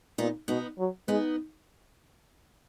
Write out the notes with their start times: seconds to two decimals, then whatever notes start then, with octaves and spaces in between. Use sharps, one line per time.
0.18 A#2 B3 D#4
0.48 B2 B3 D#4
0.78 F#3
1.08 G#3 B3 D#4